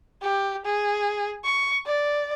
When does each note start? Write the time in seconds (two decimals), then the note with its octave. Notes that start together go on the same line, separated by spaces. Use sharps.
0.21 G4
0.65 G#4
1.44 C#6
1.86 D5